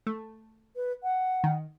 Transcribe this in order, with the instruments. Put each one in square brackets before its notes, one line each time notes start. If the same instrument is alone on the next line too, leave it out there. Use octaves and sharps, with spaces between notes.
[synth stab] A3
[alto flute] B4
F#5
[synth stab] D#3